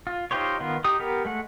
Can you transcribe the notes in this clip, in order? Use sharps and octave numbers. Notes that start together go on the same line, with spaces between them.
F4
D#4 F4 G4 C5 C#5
D#3 B3 F4
D#4 G4 D#6
B3 G4 A#4
G#3 A3 F#5